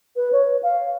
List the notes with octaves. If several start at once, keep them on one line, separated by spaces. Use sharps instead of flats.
B4
C#5
F5